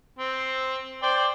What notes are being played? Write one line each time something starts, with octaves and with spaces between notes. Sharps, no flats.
C4
C5 D5 G5